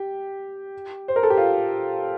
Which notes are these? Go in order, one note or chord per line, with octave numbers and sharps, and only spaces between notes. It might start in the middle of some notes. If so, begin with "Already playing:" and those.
Already playing: G4
C5
A#4
A4
G4
F4